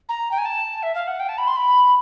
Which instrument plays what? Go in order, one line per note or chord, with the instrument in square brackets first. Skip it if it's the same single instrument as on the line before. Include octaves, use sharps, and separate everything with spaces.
[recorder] A#5
G5
G#5
A5
E5
F5
F#5
G5
A5
B5
C6
B5